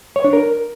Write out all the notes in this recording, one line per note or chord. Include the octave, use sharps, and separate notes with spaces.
C#5
D4
A#4